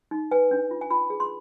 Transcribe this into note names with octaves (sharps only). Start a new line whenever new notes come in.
D#4
B4 G#5
D4
F4
G#5
F4 B5
G#4
C6